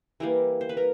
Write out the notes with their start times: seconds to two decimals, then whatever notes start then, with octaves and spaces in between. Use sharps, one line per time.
0.20 E3 G3 A#3 A#4
0.61 C5
0.69 B4
0.77 A#4